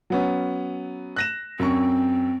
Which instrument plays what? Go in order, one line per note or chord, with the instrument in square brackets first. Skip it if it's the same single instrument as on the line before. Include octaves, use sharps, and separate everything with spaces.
[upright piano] F#3 B3 C#4
F#6 A#6 E7
[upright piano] F#2 C#6 [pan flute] C4